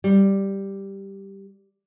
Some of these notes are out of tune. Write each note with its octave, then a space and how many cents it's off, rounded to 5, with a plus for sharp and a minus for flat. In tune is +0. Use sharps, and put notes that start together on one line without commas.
G3 +0